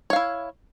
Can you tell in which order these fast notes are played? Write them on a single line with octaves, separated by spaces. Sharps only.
C#5 F5 E4